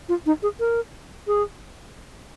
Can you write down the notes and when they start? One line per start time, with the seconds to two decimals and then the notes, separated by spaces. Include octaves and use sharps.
0.09 F4
0.26 D#4
0.43 G#4
0.60 A#4
1.27 G#4